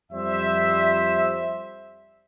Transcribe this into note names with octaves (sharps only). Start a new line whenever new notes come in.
F2 G3 C5 E5